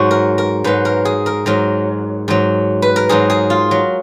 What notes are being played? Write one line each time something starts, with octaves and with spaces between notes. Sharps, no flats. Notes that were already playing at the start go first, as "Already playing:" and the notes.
Already playing: G#2 F#3 F#4
A#4
A#4
G#2 F#3 B4
A#4
G#4
A#4
G#2 F#3 A#4
G#2 F#3
B4
A#4
G#2 F#3 G#4
G#4
F4
F#3